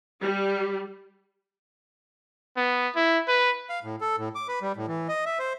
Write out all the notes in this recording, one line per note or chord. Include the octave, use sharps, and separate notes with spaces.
G3
B3
E4
B4
F5
A2
A4
A2
D6
B4
G3
A2
E3
D#5
E5
C5